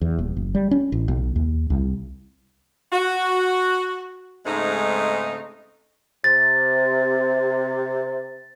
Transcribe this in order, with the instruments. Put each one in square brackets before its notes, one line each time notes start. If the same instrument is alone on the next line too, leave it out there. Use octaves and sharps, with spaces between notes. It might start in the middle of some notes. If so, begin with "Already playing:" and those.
[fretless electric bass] E2
D#1
F#1
G3
C#4
A1
B1
D#2
C2
[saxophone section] F#4
G#2 C#3 G#3 A3 C4 D#4
[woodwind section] C3 [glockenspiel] A6